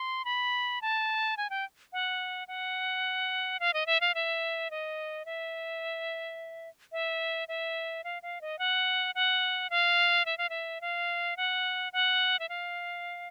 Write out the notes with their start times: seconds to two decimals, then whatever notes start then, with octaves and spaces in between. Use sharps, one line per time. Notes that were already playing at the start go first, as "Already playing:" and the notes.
Already playing: C6
0.25 B5
0.82 A5
1.37 G#5
1.50 G5
1.93 F#5
2.48 F#5
3.60 F5
3.74 D#5
3.86 E5
4.01 F5
4.15 E5
4.71 D#5
5.26 E5
6.92 E5
7.48 E5
8.04 F5
8.23 F5
8.41 D#5
8.59 F#5
9.15 F#5
9.70 F5
10.26 E5
10.38 F5
10.49 E5
10.81 F5
11.37 F#5
11.93 F#5
12.39 E5
12.49 F5